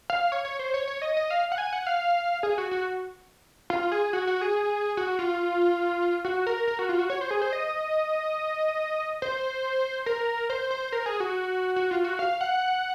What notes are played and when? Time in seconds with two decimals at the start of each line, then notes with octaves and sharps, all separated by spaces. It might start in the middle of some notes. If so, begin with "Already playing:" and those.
0.10 F5
0.32 C#5
0.45 C#5
0.59 C5
0.74 C#5
0.88 C#5
1.02 D#5
1.17 D#5
1.30 F5
1.52 F#5
1.58 G#5
1.73 F#5
1.87 F5
2.43 G#4
2.58 F#4
2.71 F#4
3.70 F4
3.92 G#4
4.13 F#4
4.27 F#4
4.41 G#4
4.97 F#4
5.19 F4
6.25 F#4
6.47 A#4
6.68 A#4
6.79 F#4
6.89 F4
6.99 F#4
7.10 C#5
7.21 C5
7.31 G#4
7.42 C5
7.53 D#5
9.22 C5
10.06 A#4
10.50 C5
10.71 C5
10.92 A#4
11.06 G#4
11.20 F#4
11.76 F#4
11.91 F4
12.04 F#4
12.19 F5
12.41 F#5